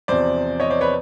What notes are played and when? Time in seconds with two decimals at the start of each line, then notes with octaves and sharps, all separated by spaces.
0.08 E2 C3 F3 C5 D5
0.60 C#5 D#5
0.70 C5 D5
0.81 B4 C#5